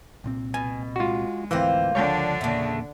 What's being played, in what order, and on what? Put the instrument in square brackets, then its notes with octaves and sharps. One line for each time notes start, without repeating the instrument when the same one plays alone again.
[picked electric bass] C2 A#2 C4
[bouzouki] B2 [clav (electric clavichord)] G#5
[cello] G#3 [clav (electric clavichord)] F4 F#4
[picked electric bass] G#1 D2 [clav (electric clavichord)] E3 C4 [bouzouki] A#3 F4 C5
[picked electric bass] C#2 F3 [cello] D3 D4 [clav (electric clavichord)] C#5 G5
[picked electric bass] E2 A#2 A#3 [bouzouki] C#3 A3